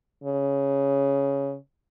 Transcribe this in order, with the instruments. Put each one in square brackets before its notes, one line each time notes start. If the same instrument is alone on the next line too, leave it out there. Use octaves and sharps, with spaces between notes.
[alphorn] C#3